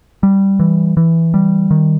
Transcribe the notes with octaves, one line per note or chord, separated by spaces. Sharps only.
G3
E3
E3
G3
D#3